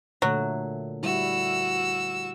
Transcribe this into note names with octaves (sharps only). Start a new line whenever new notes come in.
A#2 D3 F#3 A3
G3 E4 F#4 E6